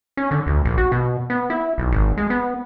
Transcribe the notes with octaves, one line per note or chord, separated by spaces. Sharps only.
C#4
D3
D2
A#1
F#4
B2
B3
E4
B1
G#1
G#3
B3